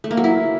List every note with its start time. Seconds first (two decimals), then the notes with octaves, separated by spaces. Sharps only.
0.04 A3
0.11 A#3
0.17 F#3
0.24 E4